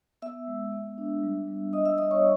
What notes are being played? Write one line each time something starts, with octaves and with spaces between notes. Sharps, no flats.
B3 E5 E6
G#3
B3
D4
G3
G3
G3 D#5 D#6
E5 E6
G3 D#5 D#6
C#5 C#6